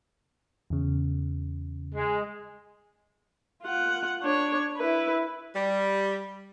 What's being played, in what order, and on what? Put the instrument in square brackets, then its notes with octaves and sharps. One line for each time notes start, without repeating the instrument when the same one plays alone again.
[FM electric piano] E2 C#3
[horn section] G#3
[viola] F4 F#5
D4 C#5
E4 B4
[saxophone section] G3